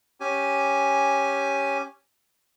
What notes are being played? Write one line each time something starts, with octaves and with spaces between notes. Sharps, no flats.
C#4 G4 G#5